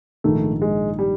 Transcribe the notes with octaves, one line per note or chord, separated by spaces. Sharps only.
A#1 G#2 D#3 A3
G#3
G3